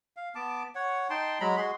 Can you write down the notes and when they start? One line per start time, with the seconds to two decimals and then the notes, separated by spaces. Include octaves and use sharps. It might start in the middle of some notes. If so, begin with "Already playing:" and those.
0.17 F5
0.35 B3 A5 D6
0.75 C#5 F#5
1.10 D#4 G5 A5 C6
1.40 F#3 G#3 A#5 B5
1.57 G#3 F#4 G#4 C6